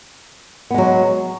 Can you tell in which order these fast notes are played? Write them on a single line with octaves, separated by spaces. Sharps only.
B3 G#3 F#3